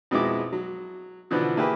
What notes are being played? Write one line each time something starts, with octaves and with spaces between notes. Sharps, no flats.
F2 B2 G#3 E4 D6
F#3
B2 D3 E3 F3 B3
A#3 E4 G4 G#4 B4